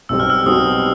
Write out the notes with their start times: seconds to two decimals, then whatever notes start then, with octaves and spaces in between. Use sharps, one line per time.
0.09 B1 B2 G3 C4 E6
0.20 F6
0.30 E6
0.45 B1 B2 G3 C4 D#6